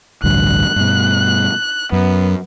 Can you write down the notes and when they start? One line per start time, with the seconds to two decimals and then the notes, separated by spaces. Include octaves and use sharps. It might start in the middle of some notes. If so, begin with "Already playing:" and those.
0.24 A1 D2 G2 F#6
0.76 G2 B2
1.92 F#2 B3